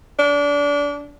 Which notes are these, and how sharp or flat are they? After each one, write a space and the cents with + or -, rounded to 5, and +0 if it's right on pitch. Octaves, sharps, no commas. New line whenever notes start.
D4 -25